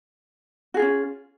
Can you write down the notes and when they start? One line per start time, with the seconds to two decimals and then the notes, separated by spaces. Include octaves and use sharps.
0.74 F#4
0.77 G#4
0.80 F4
0.82 C#4